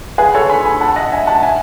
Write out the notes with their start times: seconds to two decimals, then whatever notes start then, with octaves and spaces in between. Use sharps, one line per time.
0.18 G#4 B4
0.35 A4 C#5
0.49 G#5 B5
0.65 G#5 B5
0.81 F#5 A5
0.96 D#5 F#5
1.12 E5 G#5
1.27 F#5 A5
1.42 E5 G#5